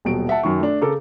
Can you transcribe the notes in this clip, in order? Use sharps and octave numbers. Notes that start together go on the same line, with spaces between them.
D#1 B2 F#3 D7
E5 F#5 A5
F#2 D#3 C#6
A3 D4
C#3 A4 A#4 D6